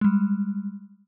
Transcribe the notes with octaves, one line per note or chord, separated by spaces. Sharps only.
G3 G#3